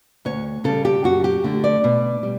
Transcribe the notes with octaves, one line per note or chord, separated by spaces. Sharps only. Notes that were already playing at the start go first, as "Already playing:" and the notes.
D2 C#5
C#3 G3 A4
G4
F#2 F#4
G4
D3 A3
D5
B2
G3